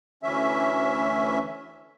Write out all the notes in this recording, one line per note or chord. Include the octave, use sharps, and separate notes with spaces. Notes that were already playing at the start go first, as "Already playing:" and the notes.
D2 E3 C#4 E5